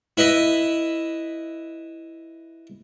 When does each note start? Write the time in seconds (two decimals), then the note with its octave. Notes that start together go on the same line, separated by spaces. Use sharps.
0.17 E4 B4 D#5 E5